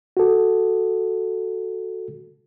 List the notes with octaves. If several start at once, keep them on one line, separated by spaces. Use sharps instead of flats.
F#4 A4